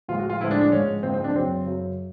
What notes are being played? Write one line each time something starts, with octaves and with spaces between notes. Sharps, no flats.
A2 F3 G#3 F4
F#4
F4
A2 F3 G#3 E4
D4
D4
G#2 F3 G#3 C#4
G#2 F3 G#3 C4
C4
D4
F#2 C#3 F#3 C4
F#2 C#3 F#3